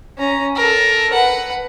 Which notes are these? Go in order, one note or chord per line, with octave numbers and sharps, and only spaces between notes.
C#4 A#5
A4 A#4
B4 F#5